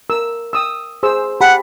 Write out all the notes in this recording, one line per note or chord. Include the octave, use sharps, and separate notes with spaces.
A#4 E6
G5 D#6 E6
G#4 C5 E6
G4 F#5 A5 B5